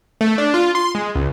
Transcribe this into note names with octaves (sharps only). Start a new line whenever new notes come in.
A3
D4
F4
C6
G#3
C#2